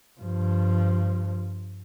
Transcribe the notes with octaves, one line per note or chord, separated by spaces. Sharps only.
G2 F3